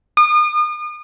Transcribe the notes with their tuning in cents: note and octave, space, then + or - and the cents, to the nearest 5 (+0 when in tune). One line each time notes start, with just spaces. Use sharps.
D#6 -40